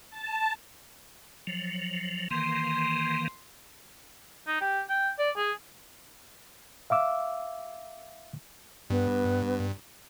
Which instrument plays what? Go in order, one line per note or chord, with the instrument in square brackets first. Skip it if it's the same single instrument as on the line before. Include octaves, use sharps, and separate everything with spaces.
[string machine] A5
[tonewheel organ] F3 F#3
[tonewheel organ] D#3 E3 A#3 [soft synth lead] C6
[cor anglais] D#4
G4
G5
D5
G#4
[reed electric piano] E5 F5 D6 E6
[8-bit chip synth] G2 [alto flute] B3